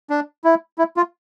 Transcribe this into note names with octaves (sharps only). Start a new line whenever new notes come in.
D4
E4
E4
F4